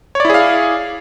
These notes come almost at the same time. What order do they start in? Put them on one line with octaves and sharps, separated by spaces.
C#5 D5 E4 G#4 F5